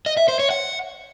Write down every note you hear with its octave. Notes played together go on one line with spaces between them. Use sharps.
D#5
E5
C5
C#5
F#5